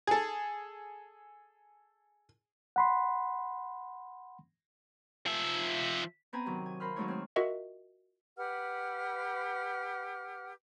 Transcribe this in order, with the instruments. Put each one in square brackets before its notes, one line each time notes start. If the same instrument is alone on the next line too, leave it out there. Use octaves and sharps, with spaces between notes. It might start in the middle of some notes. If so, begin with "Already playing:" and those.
[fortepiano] G#4 A4
[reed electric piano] F#5 B5 C6
[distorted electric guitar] F3 E5
[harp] B3 C4 B4 G#5 A#5
C3 D#3 F#3
G#5
A#4 C5 F5 B5 C6 F6
D#3 F#3 G#3 A3 D#4 C#5
C4 C#5 F6
[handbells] F4 F#4 A#4 D#5 E5 F#5
[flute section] G4 B4 F#5 F6